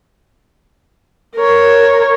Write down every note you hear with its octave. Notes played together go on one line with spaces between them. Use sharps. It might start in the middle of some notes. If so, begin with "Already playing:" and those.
A#4 C#5